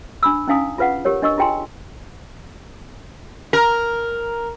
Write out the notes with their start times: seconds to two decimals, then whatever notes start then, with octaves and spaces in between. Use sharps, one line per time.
0.23 D4 B5 E6
0.48 C#4 D#4 E4 F5 G#5 D#6
0.78 F4 G#4 B4 F5 F#5
1.05 G4 A#4 C#5
1.22 D4 D#5 C#6 E6
1.38 E4 F4 G#4 G5 G#5 C6
3.53 A#4